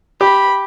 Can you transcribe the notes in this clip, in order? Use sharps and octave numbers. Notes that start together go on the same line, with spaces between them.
G4 B5